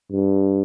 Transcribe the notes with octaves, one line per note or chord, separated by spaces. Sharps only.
G2